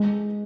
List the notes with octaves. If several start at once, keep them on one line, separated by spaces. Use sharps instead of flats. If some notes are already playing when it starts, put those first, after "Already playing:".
Already playing: G#3